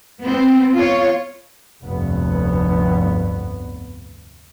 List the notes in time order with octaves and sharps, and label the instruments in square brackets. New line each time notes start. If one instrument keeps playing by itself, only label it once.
[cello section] B3 C4
F4 C#5
[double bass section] F1 D2 G2 B3